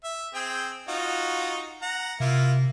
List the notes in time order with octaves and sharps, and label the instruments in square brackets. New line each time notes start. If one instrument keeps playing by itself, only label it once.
[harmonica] E5
C4 G#4 G5
D#4 F4 F#4
F#5 A#5
[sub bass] C3 [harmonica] A#3 E4 F4